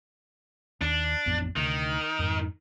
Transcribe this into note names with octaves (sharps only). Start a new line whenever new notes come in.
D#2 D4
A1 F2 B3
D2 C3 D#3
F2 G#2